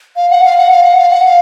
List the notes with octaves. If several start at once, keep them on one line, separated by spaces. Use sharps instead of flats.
F5
F#5
F5
F#5
F5
F#5
F5
F#5
F5